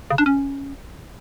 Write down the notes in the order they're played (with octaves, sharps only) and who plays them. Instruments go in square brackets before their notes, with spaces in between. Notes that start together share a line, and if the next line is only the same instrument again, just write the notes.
[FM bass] C#3
D4
C#4